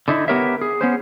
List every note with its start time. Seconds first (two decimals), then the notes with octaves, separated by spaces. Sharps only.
0.08 D3 D#4 E4
0.28 B3 G4 A#4 C#5 E5
0.61 G#4
0.81 B3 C#4 C5